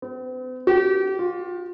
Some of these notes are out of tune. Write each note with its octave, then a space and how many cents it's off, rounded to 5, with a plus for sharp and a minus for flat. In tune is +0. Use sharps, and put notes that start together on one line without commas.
C4 -45
G4 -35
F4 +25